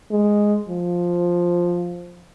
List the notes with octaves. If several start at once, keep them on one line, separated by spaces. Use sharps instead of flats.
G#3
F3